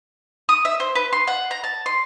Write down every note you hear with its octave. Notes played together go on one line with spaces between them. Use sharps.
D#6
E5
C5
B4
C6
F#5
A#5
A5
C6